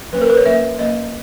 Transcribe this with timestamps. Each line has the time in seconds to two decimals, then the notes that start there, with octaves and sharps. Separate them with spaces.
0.13 F#3 A#3 C#4 B4
0.22 A#4
0.30 B4
0.37 C#5
0.46 F#3 A#3 C#4 E5
0.79 F#3 A#3 C#4 D#5